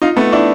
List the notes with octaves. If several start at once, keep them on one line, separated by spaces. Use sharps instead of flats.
D#4 F4
A3 B3
D4 E4